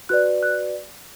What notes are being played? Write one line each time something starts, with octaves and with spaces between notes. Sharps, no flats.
F#4 B4 D5 F#6
F#6